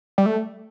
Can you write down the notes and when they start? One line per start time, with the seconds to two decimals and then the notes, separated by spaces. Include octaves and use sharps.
0.18 G3
0.26 A3